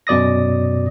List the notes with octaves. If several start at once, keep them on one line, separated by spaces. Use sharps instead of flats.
F#2 B2 D5 D#6 A#6